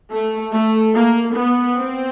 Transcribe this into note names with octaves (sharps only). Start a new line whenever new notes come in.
A3
A3
A#3
B3
C4